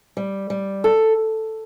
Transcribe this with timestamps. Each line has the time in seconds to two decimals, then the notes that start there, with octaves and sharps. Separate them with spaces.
0.17 G3
0.50 G3
0.84 A4